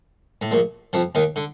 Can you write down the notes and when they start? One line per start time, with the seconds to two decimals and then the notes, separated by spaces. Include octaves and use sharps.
0.42 A2
0.51 A#1 A#2
0.93 F2 F3
1.15 D#2 D#3
1.36 D3